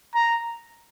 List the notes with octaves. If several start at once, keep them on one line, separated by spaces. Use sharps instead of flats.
A#5